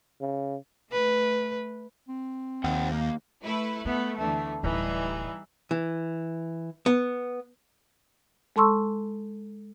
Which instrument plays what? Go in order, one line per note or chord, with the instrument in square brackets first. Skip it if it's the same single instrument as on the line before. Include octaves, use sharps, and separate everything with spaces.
[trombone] C#3
[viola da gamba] A3 B4
[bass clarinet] C4
[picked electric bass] D#2 [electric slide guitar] C5 F#5 G5
[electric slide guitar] A#3
[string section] A3 E4 B4
[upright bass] G#3 [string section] A3 [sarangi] B3
[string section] D2 D3 E3 [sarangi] A3
[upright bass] D1 D2 [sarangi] E3 [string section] G3 D#4 G#4
[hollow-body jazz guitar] E3
B3
[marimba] G#3 A4 A5 C6 C#6 E6